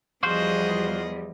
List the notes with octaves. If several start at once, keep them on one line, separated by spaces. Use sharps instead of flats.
E2 F3 G3 F4 F#4 G#4 C5 D#5